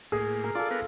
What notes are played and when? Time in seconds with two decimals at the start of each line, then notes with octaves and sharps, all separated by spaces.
0.12 A2 A#3 G#4
0.44 A#4
0.55 F4 A4 D5
0.71 B3 A#4